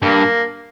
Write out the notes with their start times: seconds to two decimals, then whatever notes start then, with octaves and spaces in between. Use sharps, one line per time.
0.02 G2 A#3